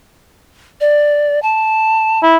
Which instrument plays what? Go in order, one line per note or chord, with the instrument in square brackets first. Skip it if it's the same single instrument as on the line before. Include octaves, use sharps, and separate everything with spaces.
[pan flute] D5
A5
[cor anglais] E4